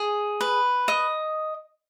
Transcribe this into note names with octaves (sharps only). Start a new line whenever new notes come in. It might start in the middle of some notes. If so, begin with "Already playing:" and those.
Already playing: G#4
B4
D#5